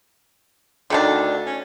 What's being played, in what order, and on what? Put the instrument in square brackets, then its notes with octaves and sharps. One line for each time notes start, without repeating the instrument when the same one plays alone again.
[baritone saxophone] D2 [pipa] D3 D#3 D4
[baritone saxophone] C#4